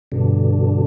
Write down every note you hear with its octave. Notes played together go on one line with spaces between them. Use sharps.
G2 B2 D3